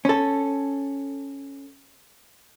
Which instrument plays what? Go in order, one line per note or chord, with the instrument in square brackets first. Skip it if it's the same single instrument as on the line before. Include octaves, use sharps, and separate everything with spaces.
[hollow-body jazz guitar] C#4 A4